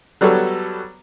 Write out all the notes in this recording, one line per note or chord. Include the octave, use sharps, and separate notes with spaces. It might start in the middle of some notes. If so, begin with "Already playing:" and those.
F#3 G3 B3 F#4 A4 C#5